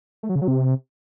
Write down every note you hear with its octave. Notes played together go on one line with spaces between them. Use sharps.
A3
F#3
C#3
F#3
C3